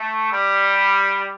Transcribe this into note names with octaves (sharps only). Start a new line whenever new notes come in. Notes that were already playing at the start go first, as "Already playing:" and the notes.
Already playing: A3
G3